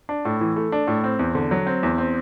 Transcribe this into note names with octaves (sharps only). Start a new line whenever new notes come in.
D4
A2
E3
A3
D4
A2
C4
E2
D3
F#3
C4
E2
C4